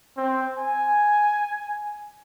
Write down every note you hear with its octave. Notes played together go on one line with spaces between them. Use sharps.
C4
G#5